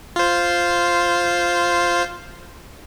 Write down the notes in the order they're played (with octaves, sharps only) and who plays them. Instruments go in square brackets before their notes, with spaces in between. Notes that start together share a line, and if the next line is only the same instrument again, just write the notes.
[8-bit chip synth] F4 C5